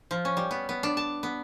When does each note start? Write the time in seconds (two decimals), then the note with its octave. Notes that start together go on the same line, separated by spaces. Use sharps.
0.11 F3
0.25 C#4
0.37 G3
0.51 B3
0.69 B3
0.83 D4
0.97 A5
1.23 B3